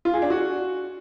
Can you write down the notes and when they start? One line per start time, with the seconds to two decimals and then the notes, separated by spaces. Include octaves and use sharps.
0.05 F4
0.14 G#4
0.22 D4
0.30 F#4